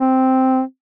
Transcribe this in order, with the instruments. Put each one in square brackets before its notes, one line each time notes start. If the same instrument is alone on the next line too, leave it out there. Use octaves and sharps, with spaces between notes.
[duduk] C4